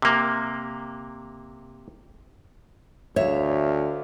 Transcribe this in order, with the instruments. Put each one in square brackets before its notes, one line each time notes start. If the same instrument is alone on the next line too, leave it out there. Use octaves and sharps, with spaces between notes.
[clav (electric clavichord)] C3 A#3
[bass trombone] D2 [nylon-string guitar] C#5 [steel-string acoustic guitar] E5 F5